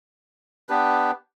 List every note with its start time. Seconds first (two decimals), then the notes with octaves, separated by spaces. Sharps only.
0.69 B3 D4 G4 B4